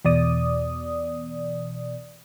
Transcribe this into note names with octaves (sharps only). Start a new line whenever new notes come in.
E2 B2 D5 D#6